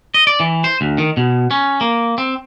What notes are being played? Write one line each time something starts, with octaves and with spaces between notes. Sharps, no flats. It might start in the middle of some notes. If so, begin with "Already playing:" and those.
D#5
D5
E3
C5
D2
D#3
B2
C#4
A#3
C4